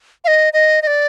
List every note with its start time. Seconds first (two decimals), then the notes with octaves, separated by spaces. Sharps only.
0.24 F5
0.28 D#5
0.53 D#5
0.82 D#5
0.87 D5